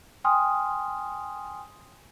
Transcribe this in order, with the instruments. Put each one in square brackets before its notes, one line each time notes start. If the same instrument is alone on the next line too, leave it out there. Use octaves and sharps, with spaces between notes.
[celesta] G5 G#5 C6 D#6 F6